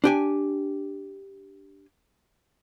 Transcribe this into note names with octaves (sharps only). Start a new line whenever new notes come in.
D4 G4 G#5